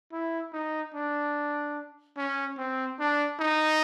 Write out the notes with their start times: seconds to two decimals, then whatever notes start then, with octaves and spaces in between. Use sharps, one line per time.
0.12 E4
0.53 D#4
0.94 D4
2.17 C#4
2.58 C4
2.99 D4
3.40 D#4